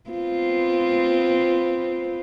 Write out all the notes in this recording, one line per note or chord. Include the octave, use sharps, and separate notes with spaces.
B3 C4 F4